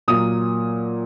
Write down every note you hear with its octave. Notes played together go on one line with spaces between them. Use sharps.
A#2 F#3 A#3 D#6